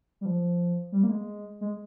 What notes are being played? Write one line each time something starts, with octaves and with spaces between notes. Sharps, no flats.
G3
F3
G3
A#3
G#3
G#3